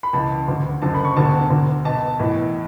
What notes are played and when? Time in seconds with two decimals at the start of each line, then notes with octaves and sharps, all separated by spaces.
0.03 B5
0.13 C#2 C#3 E3 A5
0.48 D2 D3
0.82 F#1 F#2 D3 A5
0.94 B5
1.05 C#6
1.16 E1 D2 D3 A5
1.50 D2 D3
1.84 B1 B2 A5
2.19 B1 A2 E3